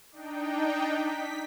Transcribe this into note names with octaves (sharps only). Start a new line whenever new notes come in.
D4 D#4 G5
B6